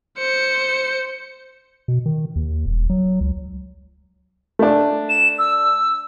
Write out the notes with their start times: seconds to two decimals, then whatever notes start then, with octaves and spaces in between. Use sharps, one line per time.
0.18 C5 C#7
1.88 B2
2.06 D#3
2.36 D#2
2.66 D#1
2.90 F#3
3.21 C#2
4.59 A3 D4
5.09 E7
5.38 E6